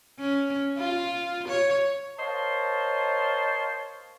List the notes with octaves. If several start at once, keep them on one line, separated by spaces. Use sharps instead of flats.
C#4
F4
C#5
A#4 C5 C#5 D#5 F5 A5